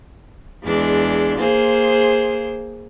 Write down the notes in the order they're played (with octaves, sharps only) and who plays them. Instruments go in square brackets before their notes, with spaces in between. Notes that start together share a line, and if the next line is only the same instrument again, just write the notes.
[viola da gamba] E2 G#3 D4
A#3 G#4 C5